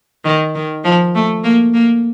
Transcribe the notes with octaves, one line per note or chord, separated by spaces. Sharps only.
D#3
D#3
F3
A3
A#3
A#3